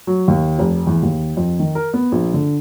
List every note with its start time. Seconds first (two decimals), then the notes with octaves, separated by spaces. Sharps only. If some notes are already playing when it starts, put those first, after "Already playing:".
0.07 F#3
0.28 D#2
0.59 F1
0.87 E2
1.03 D#2
1.37 F2
1.60 D#3
1.75 A#4
1.94 B3
2.12 A#1
2.34 D3